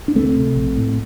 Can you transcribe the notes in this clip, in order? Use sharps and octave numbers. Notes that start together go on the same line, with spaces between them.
D4
D2 A3 C4
C3
A#1
A2